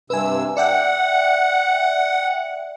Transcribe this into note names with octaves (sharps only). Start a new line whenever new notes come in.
G2 C3 B4 G#5 E6
D5 E5 F#5 G5